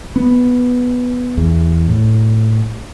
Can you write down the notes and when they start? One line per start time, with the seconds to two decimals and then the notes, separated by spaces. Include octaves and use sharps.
0.16 B3
1.37 E2
1.88 A2